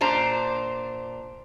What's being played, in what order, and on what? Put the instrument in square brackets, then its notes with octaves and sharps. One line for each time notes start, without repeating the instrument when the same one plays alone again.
[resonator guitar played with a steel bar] A#2 D4 C5 A#5